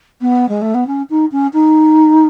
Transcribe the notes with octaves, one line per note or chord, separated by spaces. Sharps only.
B3
G#3
A3
B3
C#4
D#4
C#4
D#4